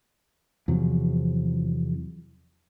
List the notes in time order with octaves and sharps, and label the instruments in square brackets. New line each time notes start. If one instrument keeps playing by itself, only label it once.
[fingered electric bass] E2 C3 F3 F#3